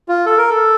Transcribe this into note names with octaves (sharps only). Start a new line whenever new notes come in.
F4
A4
A#4
A4